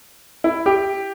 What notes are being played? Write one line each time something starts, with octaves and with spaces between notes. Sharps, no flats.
E4
G4